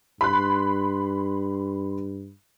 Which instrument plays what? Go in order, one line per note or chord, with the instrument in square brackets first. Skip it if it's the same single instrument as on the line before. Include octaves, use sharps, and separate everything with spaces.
[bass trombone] G2 [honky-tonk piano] B5 C6 F#6